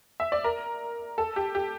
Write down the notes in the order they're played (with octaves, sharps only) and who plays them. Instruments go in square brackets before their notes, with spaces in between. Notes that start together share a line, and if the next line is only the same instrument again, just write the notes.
[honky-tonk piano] E5
D5
A#4
A4
G4
G4